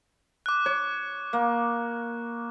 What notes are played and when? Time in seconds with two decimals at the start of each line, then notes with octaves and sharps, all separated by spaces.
0.46 D6 F#6
0.66 C#5
1.33 A#3